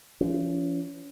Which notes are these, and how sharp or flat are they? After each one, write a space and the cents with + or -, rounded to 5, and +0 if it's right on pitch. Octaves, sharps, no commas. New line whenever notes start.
F3 -40 C#4 +30